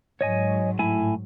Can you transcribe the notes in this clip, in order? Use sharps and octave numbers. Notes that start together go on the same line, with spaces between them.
G#2 F#3 C#5 D#5 G#5
A2 E4 G#5